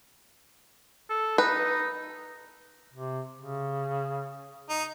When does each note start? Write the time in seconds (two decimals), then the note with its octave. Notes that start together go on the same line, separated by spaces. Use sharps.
1.10 A4
1.38 D#4 B4
2.93 C3
3.38 C#3
4.69 D#4